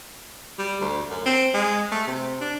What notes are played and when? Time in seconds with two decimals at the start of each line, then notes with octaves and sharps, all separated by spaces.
0.59 G3
0.81 D2
1.10 F#2
1.26 C4
1.54 G#3
1.92 A3
2.07 C3
2.41 D4